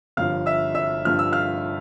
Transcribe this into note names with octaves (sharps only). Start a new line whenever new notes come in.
G1 G2 F3 F5 F6
E5 E6
E5 E6
G1 G2 F3 F6
E6
F5 F6